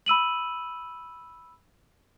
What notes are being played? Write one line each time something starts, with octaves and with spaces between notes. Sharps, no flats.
B5 E6 D#7 F#7